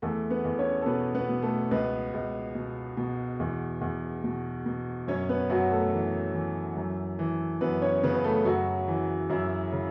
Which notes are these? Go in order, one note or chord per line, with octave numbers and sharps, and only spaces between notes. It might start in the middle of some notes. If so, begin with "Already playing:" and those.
E2 A3 A4
B3 B4
E2
C#4 C#5
A4
B2 B3 B4
B3 B4
B2
A3 A4
C#2 B3 B4
C#2
B2
B2
E2
E2
B2
B2
F#2 C#4 C#5
B3 B4
F#2 F#3 F#4
A3 A4
E3
E3
F#2
E3
F#2 B3 B4
C#4 C#5
C#3 B3 B4
B4
A3 A4
F#2 F#3 F#4
E3
F#2 E3 E4
C#3